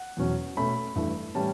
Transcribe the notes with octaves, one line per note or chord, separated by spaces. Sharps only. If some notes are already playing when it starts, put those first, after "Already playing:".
Already playing: F#5
E2 B2 F#3 C#4
B2 A3 C#4 B5
G2 E3 A3
A2 E3 G3 C#4 A5